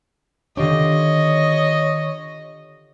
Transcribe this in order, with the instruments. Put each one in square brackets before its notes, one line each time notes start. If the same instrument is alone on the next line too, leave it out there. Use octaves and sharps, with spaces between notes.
[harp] D3 F4 G4 [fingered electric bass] D#3 D4 [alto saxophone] C#5 [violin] D#5